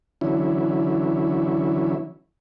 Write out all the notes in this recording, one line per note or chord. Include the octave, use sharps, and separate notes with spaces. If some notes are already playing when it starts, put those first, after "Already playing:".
D3 E3 F#3 C#4 E4